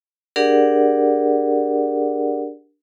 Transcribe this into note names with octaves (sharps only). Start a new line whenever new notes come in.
D4 G4 G#4 A#4 D5 F#5